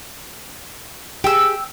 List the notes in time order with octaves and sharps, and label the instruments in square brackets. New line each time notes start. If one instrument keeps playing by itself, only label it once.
[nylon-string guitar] G4 G#4 [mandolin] G5 E6